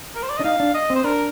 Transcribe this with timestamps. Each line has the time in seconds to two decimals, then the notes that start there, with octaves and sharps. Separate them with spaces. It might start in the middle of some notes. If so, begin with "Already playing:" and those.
0.15 A#4
0.23 C5
0.30 D5
0.37 D#5
0.40 D4
0.45 D#4 F5
0.60 D4
0.74 D#5
0.90 C4
0.96 C5
1.04 D4 A#4